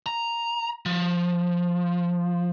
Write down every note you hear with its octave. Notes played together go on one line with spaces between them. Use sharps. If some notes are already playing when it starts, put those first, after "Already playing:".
A#5
F3